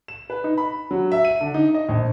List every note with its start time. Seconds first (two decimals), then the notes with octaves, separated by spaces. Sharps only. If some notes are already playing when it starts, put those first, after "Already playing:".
0.08 E7
0.30 B4
0.44 D#4
0.58 B5
0.91 F#3
1.12 E5
1.25 D#7
1.41 D3
1.54 D#4
1.74 D#5
1.89 A#1